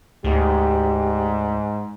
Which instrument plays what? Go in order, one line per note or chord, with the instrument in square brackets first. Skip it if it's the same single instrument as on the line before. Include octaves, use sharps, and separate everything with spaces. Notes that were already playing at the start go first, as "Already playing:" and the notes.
[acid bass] D2 [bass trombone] G#2 [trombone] G4